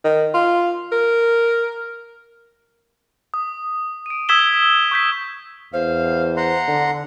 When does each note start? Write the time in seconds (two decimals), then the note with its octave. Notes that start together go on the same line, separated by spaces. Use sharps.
0.04 D#3
0.34 F4
0.92 A#4
3.34 D#6
4.06 D7 D#7
4.29 D#6 E6 G#6 B6 E7 G7
4.91 C#6 G6 B6
5.73 E2 C5 F5
6.37 F#5 A#5 C6
6.68 D3